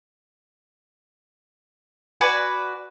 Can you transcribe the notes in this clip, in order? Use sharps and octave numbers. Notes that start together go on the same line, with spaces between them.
F#4 B4 D5 G#5